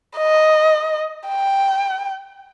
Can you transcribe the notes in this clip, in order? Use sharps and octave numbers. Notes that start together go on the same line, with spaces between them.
D#5
G5